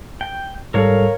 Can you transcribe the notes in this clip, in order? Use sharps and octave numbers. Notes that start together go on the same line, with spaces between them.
G5
G#2 G3 A4 A#4 C#5 F5